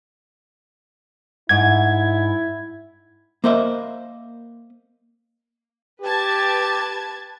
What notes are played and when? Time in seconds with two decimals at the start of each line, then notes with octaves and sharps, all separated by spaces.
1.49 G#2 E4 F#5 G#6
3.44 A#3 A#4 C5 D#5 E5
6.02 G4 B4 A5 G#6